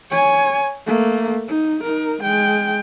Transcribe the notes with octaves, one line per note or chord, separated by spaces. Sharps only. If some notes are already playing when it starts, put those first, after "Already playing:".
C#5 G#5
A3 A#3
D#4
D#4 A#4
G#3 G5